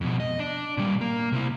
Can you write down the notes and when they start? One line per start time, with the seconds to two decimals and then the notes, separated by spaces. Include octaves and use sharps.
0.01 F2 B2
0.20 D#5
0.39 D4
0.77 A#2 G3
1.01 A#3
1.32 C3 E4